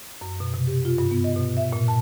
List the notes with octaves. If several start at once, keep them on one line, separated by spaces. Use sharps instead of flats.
F#2
B2
C3
G4
F4
G2
B3
D#5
B2
E5
A#2
A5